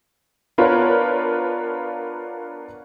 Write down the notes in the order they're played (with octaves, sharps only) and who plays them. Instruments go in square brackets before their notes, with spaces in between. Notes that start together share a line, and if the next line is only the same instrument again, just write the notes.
[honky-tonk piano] B3 D4 F4 A#4 B4 C#5